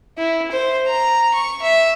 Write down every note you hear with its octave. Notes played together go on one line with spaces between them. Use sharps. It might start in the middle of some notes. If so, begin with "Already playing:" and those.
E4
C5
A#5
C#6
E5